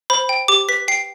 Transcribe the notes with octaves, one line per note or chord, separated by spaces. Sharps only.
C5 B5
G5
G4 D6
B4 B6
G5 C7